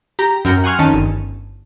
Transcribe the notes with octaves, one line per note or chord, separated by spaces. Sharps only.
G4 A#5
F#2 A#4 G5 C#7
F#5 G#5 C6 C#6 F6
F2 D#3 C#4 A5 D#7
G1